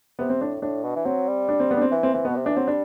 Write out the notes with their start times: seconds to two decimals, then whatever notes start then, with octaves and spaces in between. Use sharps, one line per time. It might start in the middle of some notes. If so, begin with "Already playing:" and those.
0.19 C3 B3
0.30 C4
0.41 A2 D4
0.62 A2 D4
0.84 B2
0.96 E3
1.05 F#3 C4
1.28 G3
1.49 D4
1.60 C4
1.71 B3
1.77 D4
1.82 C4
1.92 E3
2.03 C4
2.14 E3 C4
2.25 B2 B3
2.36 C3
2.46 E3 D4
2.57 F#3 C4
2.68 G3 D4